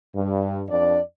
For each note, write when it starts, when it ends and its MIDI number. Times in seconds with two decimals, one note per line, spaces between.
0.15 0.62 43
0.69 1.00 41
0.69 1.00 62
0.69 1.00 74